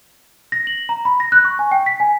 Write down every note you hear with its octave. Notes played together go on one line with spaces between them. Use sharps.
A#6
F#7
A#5
B5
A#6
F#6
C#6
G#5
G5
B6
G#5